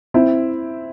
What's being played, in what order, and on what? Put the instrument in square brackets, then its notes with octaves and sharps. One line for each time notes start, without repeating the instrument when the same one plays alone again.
[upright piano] C4 E4